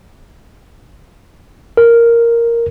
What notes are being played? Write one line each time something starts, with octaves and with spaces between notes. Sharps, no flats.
A#4